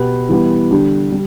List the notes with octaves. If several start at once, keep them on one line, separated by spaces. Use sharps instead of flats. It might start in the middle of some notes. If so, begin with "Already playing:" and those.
Already playing: B2 B3 G4 B4
E3 G3 B3
D3 G3 D4 G4
G3